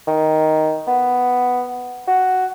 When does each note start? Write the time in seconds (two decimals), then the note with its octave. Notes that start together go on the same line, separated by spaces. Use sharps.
0.07 D#3
0.87 B3
2.07 F#4